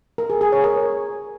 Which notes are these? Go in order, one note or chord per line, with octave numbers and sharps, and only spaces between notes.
A#4
G#4
G#4
C#5
A#4